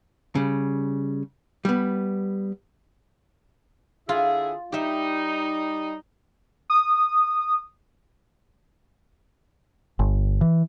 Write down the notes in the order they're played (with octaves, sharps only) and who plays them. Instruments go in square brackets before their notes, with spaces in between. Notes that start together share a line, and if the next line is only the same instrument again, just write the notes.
[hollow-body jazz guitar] C#3 G3
G3 B3
[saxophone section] D3 E4 G#4 [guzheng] F4
[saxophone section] G3 D#4 [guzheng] G4 E5
[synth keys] D#6
[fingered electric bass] G1
E3